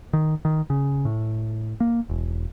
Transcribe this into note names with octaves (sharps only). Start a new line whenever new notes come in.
D#3
D#3
C#3
A2
A#3
E1